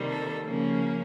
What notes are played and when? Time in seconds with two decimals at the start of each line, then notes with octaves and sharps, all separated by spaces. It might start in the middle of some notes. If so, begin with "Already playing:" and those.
Already playing: C3 D#3 G3 A#3
0.08 A4
0.44 C#3 F3 A#3 C#4